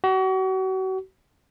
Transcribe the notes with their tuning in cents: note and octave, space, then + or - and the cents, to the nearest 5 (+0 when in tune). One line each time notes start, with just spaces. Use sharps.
F#4 +35